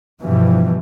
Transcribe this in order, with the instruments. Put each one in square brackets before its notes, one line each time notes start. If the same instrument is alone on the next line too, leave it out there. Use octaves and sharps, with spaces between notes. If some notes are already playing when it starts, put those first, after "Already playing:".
[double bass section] G2 B2 E3 F3 G3